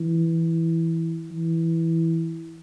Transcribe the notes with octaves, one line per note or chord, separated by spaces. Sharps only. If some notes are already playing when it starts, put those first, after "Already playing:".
Already playing: E3
E3